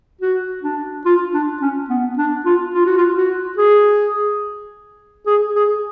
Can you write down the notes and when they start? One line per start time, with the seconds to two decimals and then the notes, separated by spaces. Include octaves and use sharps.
0.21 F#4
0.63 D4
1.05 F4
1.34 D4
1.62 C#4
1.89 B3
2.18 D4
2.46 F4
2.74 F4
2.86 F#4
2.97 F4
3.16 F#4
3.58 G#4
5.26 G#4
5.55 G#4